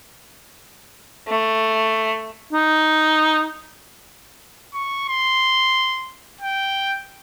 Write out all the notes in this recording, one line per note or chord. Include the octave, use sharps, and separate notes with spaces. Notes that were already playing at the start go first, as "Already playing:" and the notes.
A3
D#4
C#6
C6
G5